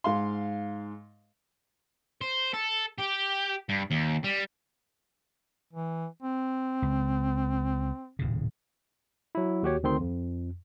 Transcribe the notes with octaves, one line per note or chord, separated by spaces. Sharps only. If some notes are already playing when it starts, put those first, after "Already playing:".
G#2 F5 C6
C5
A4
G4
G2
D#2
G3
E3
C4
C#2
D#1 A2 C#3
F#3 E4
D#2 F#4 G4 C#5
D2 D#3 C4 C6
F2